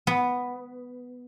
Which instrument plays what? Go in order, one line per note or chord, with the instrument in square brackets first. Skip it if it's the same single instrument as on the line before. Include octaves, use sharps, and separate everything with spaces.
[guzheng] B3